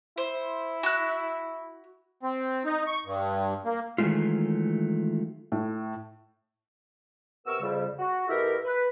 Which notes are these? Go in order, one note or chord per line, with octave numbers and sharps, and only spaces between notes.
E4 C5
F#4 F#6
C4
D#4
C#6
G2
A#3
D#3 E3 F#3 G#3 A3 F4
A2
C3 B3 A#4 C#6 E6
F2 C#3 G3
F#4
B2 E4 G4 A4 A#4
B4